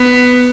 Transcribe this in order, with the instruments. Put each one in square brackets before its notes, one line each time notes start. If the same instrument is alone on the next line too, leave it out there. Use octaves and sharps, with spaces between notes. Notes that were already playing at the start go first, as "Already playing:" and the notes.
Already playing: [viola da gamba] B3